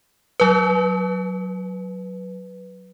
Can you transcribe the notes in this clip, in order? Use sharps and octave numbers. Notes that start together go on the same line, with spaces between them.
F#3 B4